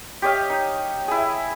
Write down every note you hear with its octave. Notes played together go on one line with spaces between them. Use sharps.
G4 C#5 D#5 F5
D#4
E4 G#4